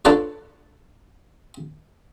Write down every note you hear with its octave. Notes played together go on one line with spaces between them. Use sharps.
D4 F4 A4 B4 C#5 D5